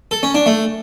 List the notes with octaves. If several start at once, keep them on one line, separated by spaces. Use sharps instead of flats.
A4
C#4
D4
A3